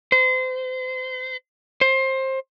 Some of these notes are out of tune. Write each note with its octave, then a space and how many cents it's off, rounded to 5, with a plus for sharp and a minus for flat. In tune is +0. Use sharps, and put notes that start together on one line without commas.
C5 -30
C5 +20